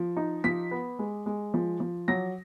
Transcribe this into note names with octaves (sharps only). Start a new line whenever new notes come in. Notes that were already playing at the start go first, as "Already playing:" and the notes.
Already playing: F3
D#4
F3 B6
B3
G#3
G#3
F3
F3
F#3 A#6